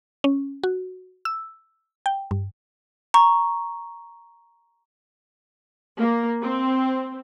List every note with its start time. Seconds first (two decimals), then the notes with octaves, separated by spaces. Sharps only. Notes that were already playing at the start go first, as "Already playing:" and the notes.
0.24 C#4
0.63 F#4
1.25 E6
2.06 G5
2.31 G2
3.14 A#5 C#6
5.99 A#3
6.43 C4